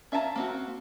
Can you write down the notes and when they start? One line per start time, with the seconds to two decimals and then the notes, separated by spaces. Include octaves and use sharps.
0.12 C#4 E5 F5 A5 A#5
0.36 A#3 C4 F#4